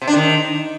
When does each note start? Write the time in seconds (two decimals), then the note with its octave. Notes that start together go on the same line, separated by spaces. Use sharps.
0.02 C3
0.08 D4
0.14 D#3